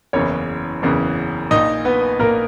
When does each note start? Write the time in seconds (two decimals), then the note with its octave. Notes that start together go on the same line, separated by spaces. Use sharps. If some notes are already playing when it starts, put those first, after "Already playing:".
0.13 F#1 E2 C#3 E3 C#4 C#5
0.82 F#1 E2 C#3 E3
1.51 A#1 A#2 D#4 D#5
1.85 B3 B4
2.19 A#1 A#2 A#3 A#4